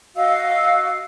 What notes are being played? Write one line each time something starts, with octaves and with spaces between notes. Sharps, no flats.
F#4 D#5 F5 E6